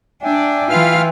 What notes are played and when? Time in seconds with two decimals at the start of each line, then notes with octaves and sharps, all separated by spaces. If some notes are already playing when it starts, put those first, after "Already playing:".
0.23 D4 E5 G5 G#5
0.70 E3 F4 B4 F5 F6